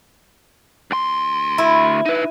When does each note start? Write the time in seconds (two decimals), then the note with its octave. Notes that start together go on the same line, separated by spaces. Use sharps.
0.91 D2 C6
1.58 E4
2.06 D#4 B4